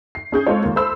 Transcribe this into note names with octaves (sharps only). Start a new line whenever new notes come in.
C7
C#4 G#4 G6
G#3 C4 F4 A4 C#5
D#2 A#3
A4 C5 B5 E6